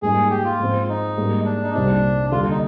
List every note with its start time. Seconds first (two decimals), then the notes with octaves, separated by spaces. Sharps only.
0.02 G#2 G3 A#3 D#4 G#4
0.30 G4
0.45 F4
0.60 G#2 F3 C4
0.89 D#4
1.17 G#2 G3 A#3
1.45 D4
1.63 D#4
1.74 C2 A#2 G3 C4 D4 D#4
2.32 D#2 D3 G3 F4
2.50 D#4